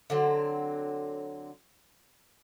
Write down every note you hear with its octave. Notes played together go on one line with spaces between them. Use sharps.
D3 F#3 C4